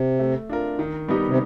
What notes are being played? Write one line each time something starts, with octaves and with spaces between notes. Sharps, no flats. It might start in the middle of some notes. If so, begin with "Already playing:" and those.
Already playing: C3
A3
D4 F4 A#4
D#3
G3 B3 D#4 G4
C3